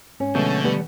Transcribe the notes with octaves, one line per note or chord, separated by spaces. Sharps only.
G#2 C#4
B2 D3 F3 G#3 A3 G6
G3 B3